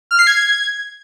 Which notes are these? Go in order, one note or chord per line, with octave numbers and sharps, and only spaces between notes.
F6
C7
G#6